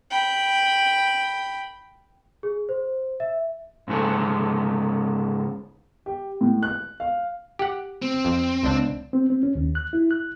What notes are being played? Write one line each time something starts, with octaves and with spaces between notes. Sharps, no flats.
G5 B5
G#4
C5
E5
G#2 C#3 G#3 A4
G4
A2
F#6
F5
G4 F#5
C4
F2
C#2 D4
C4
C4
C#4
D#2
F#6
E4
F#6